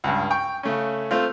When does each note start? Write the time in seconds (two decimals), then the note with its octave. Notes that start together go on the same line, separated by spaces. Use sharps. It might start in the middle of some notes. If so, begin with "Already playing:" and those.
0.04 C#2 G2
0.31 G5 C#6
0.63 C#3 A3 C#4
1.11 A3 C4 F4